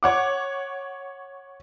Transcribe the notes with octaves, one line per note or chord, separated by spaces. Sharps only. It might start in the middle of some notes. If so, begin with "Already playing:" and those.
C#5 F#5 D6